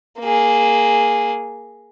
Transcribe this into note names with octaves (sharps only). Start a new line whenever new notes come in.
A#3 G#4